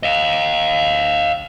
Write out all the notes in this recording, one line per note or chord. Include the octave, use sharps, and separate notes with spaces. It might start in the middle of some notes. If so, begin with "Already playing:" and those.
D#5 F5